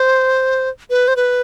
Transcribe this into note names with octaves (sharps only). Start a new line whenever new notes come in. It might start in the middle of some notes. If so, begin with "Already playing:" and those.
Already playing: C5
B4
C5
B4